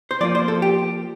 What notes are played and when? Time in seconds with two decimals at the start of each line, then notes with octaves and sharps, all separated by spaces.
0.11 C5
0.21 F3 A#3 F4 D5
0.35 C5
0.48 A4
0.62 G4